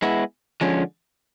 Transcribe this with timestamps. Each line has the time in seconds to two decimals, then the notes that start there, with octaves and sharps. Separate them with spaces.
0.02 G#3 B3 E4
0.61 D3 F3 G#3 C#4